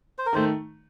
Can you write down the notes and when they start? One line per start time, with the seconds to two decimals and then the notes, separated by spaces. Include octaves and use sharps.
0.18 C5
0.26 A#4
0.33 D#3 A3 C5